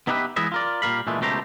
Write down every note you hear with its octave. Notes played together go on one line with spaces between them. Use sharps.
B3 D#4 E4 G4 B4 E5
E3 G#3 B3 E4 D#5 E5
F4 A#4 D5
A#2 G3 A#4 F5 B5
A#2 E3 G#3 A3
C#2 B2 A3 G4 C5 A#5